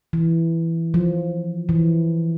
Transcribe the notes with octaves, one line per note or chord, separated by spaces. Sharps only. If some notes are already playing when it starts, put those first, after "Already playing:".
E3
F3
E3